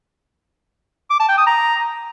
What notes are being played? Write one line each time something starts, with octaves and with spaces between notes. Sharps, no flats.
D6
A5
G5
D#6
A#5